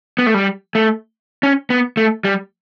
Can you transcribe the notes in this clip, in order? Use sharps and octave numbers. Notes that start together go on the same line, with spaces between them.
B3
A3
G3
A3
C#4
B3
A3
G3